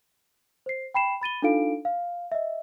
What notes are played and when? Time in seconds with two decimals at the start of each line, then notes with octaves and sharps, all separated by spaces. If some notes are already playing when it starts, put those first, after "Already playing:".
0.66 C5 C7
0.94 G5 B5 C7 E7
1.21 B5 A6 D#7 G7
1.42 D4 D#4 F4 A4 F5 D7
1.85 F5
2.32 D#5 E5